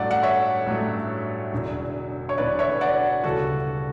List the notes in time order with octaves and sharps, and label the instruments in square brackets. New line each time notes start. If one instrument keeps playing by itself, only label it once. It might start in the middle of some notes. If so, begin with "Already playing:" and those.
Already playing: [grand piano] A1 G2 F#3 A3 [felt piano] D5 F#5
[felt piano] F#5
C#5 E5
[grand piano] A1 G2 F#3 A3
E1 E2 D3 F#3
[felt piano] C#5
[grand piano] E1 E2 D3 F#3 [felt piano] B4 D5
[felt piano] C#5 E5
D5 F#5
[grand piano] E1 D2 C#3 E3 G3 [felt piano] F#4 A4